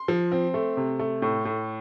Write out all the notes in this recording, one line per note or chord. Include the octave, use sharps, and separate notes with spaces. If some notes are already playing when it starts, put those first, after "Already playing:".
Already playing: C6
F3
C4
A3
C3
A3
A2
A2